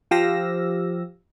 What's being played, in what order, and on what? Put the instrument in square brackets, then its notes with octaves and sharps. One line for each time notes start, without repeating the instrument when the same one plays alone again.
[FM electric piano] F3 G4 F5 E6 A#6